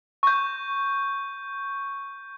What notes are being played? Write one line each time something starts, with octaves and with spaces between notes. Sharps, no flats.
C#6 G6